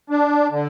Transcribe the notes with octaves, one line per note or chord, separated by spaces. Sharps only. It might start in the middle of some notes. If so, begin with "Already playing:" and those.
D4
D3